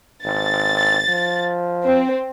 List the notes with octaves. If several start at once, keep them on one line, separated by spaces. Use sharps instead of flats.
G#1 A6
F3
C4